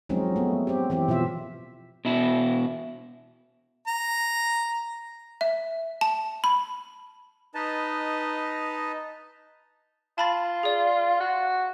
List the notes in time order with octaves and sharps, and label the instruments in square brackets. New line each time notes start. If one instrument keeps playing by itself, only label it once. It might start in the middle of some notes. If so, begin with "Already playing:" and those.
[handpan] F3 F#3 G#3 C4 C#4 D#4
A3 B3
C4 G4
E3 C4 G4
B2 F3 F4 E5
[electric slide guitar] B2 E4
[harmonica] A#5
[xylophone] E5
A5
B5
[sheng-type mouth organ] D#4 B4 D#5 A5
[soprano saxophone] F4 [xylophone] A5 B5 A6
[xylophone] G#4 D5
[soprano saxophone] F#4